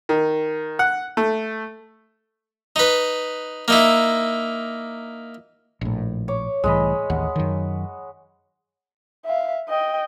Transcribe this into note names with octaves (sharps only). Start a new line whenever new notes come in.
D#3
F#5
A3
D#4 B4
A#3 D#4 E4
A#1 A2
C#5 D6
C2 A2 E3 G#3 D#5 B5
A1 D#2 F#5
F#2 D#3
E5 F5
D#5 G5